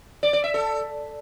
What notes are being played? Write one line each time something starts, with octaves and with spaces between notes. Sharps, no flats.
D5
D5
E5
A4